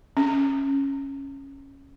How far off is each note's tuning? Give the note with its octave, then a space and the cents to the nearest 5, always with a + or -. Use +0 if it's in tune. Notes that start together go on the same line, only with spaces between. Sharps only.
C#4 -10